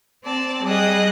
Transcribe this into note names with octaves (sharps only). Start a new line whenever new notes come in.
C4 D5 A5
G3 G#4 D#5 F#6